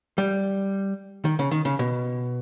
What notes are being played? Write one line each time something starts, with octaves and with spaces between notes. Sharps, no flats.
G3
D#3
C#3
D#3
C#3
B2